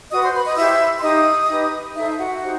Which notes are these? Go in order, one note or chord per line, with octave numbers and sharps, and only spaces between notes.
F#4 B4 D#5 D#6
C5 C6
B4 B5
D#5 D#6
E4 G4 C5 E5 E6
C6
D#4 G4 C5 D#5 D#6
D#4 G4 B4
D#4 A4 C5 E5
E5
F#4 F#5
D#4 G4 C5